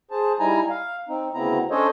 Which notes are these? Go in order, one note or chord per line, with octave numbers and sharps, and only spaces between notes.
G#4 C5 A5
G3 D#4 E4 G#5 A#5
F5
C4 D#4
D2 C#3 B3 C4 E4 A#5
C#4 D4 A4 C5 C#5 D#5